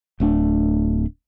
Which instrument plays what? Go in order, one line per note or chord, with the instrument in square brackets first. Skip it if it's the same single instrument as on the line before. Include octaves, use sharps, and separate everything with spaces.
[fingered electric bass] D1 A3 D4